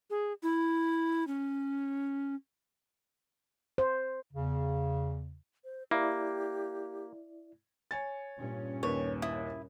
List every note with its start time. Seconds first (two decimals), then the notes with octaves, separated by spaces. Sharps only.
0.10 G#4
0.43 E4
1.27 C#4
3.78 C5
4.33 E2 C#3
5.64 C5
5.91 A#3 E4 G4 D5
7.91 C#5 G#5 A6
8.38 G2 A#2 C#4
8.83 D#2 B4 C#5
9.22 E4 D#6